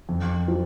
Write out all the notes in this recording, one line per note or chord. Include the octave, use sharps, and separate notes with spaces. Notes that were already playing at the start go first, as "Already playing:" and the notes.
F2
F3